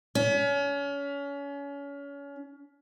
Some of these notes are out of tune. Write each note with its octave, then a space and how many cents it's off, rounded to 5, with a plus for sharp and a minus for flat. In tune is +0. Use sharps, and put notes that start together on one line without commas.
C#4 +30